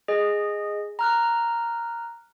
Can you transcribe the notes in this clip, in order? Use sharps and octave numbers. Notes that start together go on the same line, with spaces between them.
G#4 D#5
A#5 F6 F#6